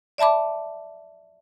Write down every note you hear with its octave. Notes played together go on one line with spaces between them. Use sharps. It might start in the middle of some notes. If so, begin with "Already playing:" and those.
D5 E5 A5 B5 D6